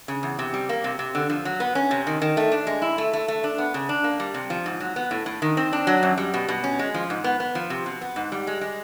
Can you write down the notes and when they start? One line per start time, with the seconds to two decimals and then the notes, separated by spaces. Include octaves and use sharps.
0.08 C#3
0.23 E2
0.39 C3
0.54 G3
0.69 A#3
0.84 C3
0.99 C3
1.15 D3
1.30 F3
1.45 F#3
1.60 B3
1.75 C#4
1.91 C3
2.07 D#3
2.22 D#3
2.37 A3
2.52 D4
2.67 G#3
2.82 E4
2.98 A3
3.13 A3
3.28 A3
3.44 D4
3.58 B3
3.74 C#3
3.89 D4
4.04 A#3
4.20 G3
4.34 C3
4.50 F3
4.66 G#2
4.80 F#3
4.96 B3
5.11 A2
5.26 A2
5.42 D#3
5.57 C4
5.73 D4
5.87 F#3
6.03 F#2
6.17 G3
6.34 B2
6.48 B2
6.64 C#4
6.79 G#3
6.94 F3
7.10 G#2
7.24 B3
7.40 B3
7.55 F3
7.70 C3
7.86 B2
8.01 B3
8.16 G#2
8.32 G3
8.47 G#3
8.61 G#3